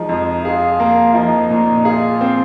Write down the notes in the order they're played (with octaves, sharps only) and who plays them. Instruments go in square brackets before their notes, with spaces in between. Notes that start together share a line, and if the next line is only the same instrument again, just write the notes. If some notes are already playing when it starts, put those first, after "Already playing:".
Already playing: [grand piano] F3 G#3 [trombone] D#4
[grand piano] F2
[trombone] F4 [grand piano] G#4
[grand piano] A#3
[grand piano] F3 [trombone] D#4
[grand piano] A#2
[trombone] F4 [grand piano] G#4
[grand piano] C4